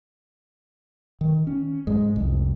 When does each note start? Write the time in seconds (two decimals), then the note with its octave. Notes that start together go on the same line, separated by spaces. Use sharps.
1.21 D#3
1.47 C#4
1.87 G#2 G#3
2.16 C2 F2